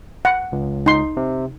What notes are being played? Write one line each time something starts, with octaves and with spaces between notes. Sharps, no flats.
F#5
C#2
D#4 C6
C3